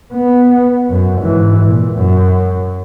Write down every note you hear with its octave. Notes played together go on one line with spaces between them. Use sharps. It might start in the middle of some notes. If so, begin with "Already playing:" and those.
B3
F#2
G#2 E3
A#2
F#2